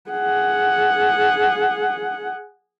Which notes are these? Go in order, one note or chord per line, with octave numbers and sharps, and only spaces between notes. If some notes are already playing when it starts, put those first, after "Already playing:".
G#4 F#5